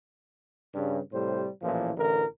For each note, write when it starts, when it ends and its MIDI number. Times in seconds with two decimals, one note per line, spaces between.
0.75 0.99 43
0.75 0.99 49
1.12 1.47 45
1.12 1.47 48
1.12 1.47 55
1.12 1.47 72
1.62 1.91 33
1.62 1.91 46
1.62 1.91 52
1.62 1.91 53
1.97 2.24 33
1.97 2.24 50
1.97 2.24 52
1.97 2.24 70